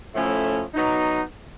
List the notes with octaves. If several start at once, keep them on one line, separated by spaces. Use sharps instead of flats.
A2 F3 A3 C#4 E4
F#3 B3 D#4